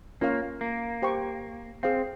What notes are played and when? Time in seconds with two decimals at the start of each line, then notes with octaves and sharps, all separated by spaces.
0.21 A#3 C#4 F4 A#4 C#5 F5
0.61 A#3
1.02 G4 C5 G5 C#6
1.83 C4 G#4 C5 F5